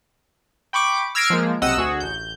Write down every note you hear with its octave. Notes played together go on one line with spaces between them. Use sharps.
G5 B5 C#6 D6
E6 F6 G#6 A#6 C7 D7
F3 G#3 A#3
B1 C3 D#5 F#5 E6
D2 F#4 G#4
A1 G6